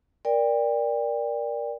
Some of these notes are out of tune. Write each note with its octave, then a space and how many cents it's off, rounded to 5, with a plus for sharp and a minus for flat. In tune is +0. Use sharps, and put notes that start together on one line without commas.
A#4 +10 D5 +0 G5 +30